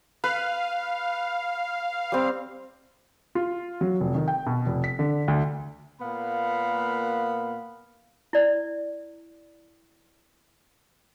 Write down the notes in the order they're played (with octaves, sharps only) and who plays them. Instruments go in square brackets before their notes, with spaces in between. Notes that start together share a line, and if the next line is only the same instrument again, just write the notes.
[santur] B4 [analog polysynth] F5
[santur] G3 C4
[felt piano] F4
F#3
F1
D#3
G5
B2
F1
B6
D3
D2
[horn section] A#2 A#3 B3 F5 B5
[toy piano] E4 D5